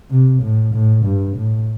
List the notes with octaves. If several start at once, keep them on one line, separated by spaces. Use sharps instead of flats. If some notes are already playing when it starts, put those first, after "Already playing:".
C3
A2
A2
G2
A2